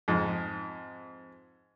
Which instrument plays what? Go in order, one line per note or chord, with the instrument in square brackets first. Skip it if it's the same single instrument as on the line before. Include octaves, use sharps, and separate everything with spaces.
[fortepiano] F2 G#2